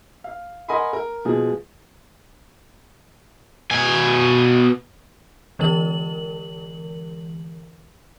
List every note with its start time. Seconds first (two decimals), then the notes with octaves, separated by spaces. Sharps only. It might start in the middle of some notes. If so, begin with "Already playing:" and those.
0.24 F5
0.68 A#4 D#5 F#5 G#5 B5 C6
0.93 A#4
1.25 B2 F3 G#3 G#4
3.71 B2 G#5
5.59 D3 E3 G#3 A#4 F#7